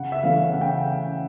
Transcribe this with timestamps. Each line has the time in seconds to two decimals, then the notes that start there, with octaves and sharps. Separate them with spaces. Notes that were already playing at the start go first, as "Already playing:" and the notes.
Already playing: C#3 F#5
0.12 E5
0.23 E3 A3 C#4 F5
0.53 C#3 F#5
0.61 G5
0.69 F#5